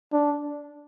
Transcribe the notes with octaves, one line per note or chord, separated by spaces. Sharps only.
D4